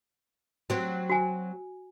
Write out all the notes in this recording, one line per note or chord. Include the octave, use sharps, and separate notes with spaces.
F#3 C4
F#4 G#5